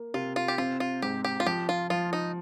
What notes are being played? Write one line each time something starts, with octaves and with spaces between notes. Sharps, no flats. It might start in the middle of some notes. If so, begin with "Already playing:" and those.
Already playing: A#3
C3 F4
F4
G4
C4 F4
F4
G#2 G4
G4
F4
F3 G4
F4
F3 F4
D#4